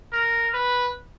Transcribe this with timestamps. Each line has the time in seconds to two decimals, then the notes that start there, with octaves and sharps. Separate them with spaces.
0.13 A#4
0.54 B4